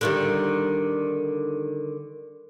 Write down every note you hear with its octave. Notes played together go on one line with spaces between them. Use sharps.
D3 D#3 G3